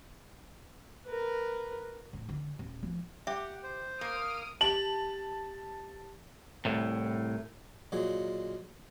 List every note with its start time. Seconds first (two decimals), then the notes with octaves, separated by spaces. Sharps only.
1.06 A#4 B4
2.13 A2
2.29 D3
2.59 D#1
2.83 F3
3.27 G4 E5 F#5
3.63 C5
4.01 A#3 D#6 F6 D7
4.61 G4 A5 F#7
6.65 C2 A2
7.92 A#2 F#3 G#3